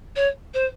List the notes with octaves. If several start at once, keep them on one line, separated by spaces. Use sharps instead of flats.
C#5
C5